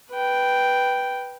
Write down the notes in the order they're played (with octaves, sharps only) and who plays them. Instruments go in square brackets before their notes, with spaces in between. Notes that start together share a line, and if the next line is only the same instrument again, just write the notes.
[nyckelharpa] B4 G5